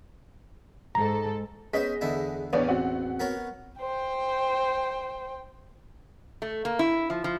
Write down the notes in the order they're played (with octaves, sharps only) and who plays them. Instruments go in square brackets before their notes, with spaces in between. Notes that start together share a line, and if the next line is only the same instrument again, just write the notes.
[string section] G#2 A4 [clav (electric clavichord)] A#5
[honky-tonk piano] B3 D#5 B6 [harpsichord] C#4 C5 [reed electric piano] G#4
[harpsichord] E2 D3 E4
[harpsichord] A1 E2 [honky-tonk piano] B3 C#4 D4
[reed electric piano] C4 F#4 [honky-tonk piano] F#5
[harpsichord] B3 A#4 C#5
[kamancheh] C5 G5
[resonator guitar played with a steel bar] A3
A#3
E4
F3
F3